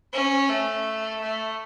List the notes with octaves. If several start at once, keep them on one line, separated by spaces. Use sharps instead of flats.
C#4
A3
A3